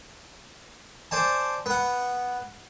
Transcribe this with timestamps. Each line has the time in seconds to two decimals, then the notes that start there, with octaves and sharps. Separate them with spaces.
1.11 C5 D5 G#5 A5
1.66 B3 F#5